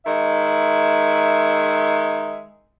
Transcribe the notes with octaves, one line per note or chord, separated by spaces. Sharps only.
D#3 G#3 E5